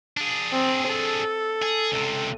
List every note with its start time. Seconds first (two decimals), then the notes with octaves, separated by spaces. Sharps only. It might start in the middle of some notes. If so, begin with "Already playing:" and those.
0.17 D4 G#4
0.53 C4
0.90 A4
1.62 G#4
1.92 C#2 C3